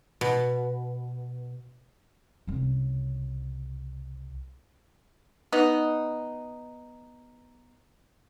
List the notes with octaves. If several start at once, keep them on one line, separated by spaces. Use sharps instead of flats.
B2
C2 C#3
B3 D#4